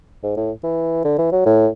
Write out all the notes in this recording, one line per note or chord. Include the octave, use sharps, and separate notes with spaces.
G#2
A2
E3
D3
E3
F#3
A2